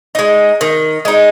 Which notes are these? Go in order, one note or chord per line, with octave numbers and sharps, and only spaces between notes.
G#3 D#4
D#3
G#3 D#4